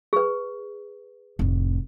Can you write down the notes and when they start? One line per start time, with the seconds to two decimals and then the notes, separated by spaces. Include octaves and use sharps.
0.13 G#4 B4
1.39 F1 A2